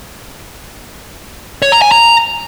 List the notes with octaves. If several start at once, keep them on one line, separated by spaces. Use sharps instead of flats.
C#5
A#5
G#5
A#5